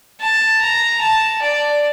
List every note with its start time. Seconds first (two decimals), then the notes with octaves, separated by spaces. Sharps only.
0.20 A5
0.61 A#5
1.01 A5
1.41 D5